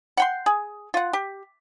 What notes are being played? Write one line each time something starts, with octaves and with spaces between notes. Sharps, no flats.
F#5 G5 C6
G#4
F4 F#5
G4